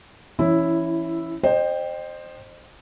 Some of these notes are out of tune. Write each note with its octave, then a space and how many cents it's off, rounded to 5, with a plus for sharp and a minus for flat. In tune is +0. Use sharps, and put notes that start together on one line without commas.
E3 +25 C#4 +0 E4 +0
C5 +10 D#5 -40 G5 +0